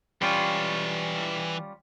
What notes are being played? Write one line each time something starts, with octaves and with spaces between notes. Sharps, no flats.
E3 G3 C#4 F4 G5